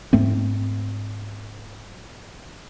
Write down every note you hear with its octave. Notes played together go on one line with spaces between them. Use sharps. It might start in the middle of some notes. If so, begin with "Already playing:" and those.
G#2 A3 C4